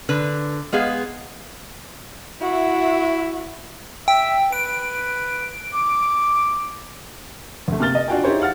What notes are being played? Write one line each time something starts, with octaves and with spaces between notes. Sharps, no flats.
D3 B4
G#3 B3 G#4 F5
E4 F#4 E5
E5 G5
B4 D7
D6
D2 A3
C3 A#3 F6 A6 G7
D#5
D4 F4 F#4 F5 G5 G#5
D#4 E4 G4 G#4 C5 C#5
F5 F#5 F6 A6